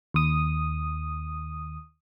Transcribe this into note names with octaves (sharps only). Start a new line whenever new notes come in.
D#2 D#6